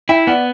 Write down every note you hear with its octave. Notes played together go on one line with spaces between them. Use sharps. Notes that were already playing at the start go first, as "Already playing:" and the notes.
E4 E5 G5
B3 D5 F#5